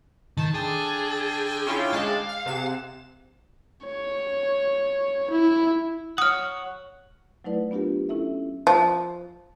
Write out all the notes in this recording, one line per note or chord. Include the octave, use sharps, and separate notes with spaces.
D#3 A5
D3 D4 G#4 G5
C#4 E4 F4
G#3 F5 A5 F#6
F6
C3 G#4 F#5 E7
C#5
E4
C#5 F#5 D#6 F6
F#3 A3 D#4 E4 B4 D5
B3 D4 F4 G4 A#4
C#4 E4 A4 E5
F3